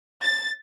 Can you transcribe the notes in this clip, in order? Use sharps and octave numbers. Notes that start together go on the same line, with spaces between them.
A6